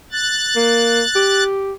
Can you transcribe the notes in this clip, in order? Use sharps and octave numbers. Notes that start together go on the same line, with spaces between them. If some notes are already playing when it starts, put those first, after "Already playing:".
F#6 A6
A#3
G4